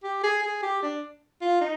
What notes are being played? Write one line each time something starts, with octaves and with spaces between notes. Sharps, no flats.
G4
G#4
G#4
G4
D4
F4
D#4